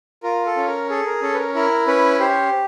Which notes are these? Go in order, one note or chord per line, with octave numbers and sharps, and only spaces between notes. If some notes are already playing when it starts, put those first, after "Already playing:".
F4 A#4
A4
C#4
A#4
G#4 A4
A#4
C#4 A4
B4
A#4
E4 A#4
C#4 B4
G4 C5